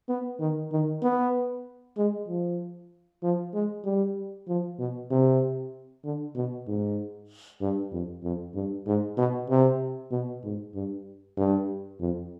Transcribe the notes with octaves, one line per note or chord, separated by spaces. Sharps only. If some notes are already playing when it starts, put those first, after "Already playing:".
B3
D#3
D#3
B3
G#3
F3
F3
G#3
G3
F3
B2
C3
D3
B2
G#2
G2
F2
F2
G2
G#2
B2
C3
B2
G#2
G2
G2
F2